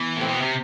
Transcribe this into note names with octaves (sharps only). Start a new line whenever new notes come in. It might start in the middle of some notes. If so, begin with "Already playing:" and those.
Already playing: E3 B3
A2 C4
B2
C3